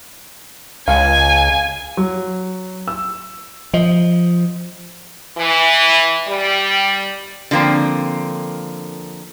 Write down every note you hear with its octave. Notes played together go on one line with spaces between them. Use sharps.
C#2 F5 G#5
F#3
E6
F3 D#5
E3
G3
D3 F3 A#3 C4